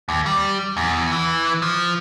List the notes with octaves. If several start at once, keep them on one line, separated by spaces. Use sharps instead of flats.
D#2
G3
E2
E3
F3